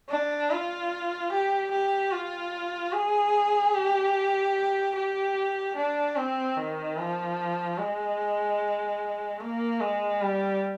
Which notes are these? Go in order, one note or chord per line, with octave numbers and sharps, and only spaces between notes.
D4
F4
G4
G4
F4
G#4
G4
G4
D4
C4
D#3
F3
G#3
A#3
G#3
G3